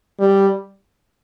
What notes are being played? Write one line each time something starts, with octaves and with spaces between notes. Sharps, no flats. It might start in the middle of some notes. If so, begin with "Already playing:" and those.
G3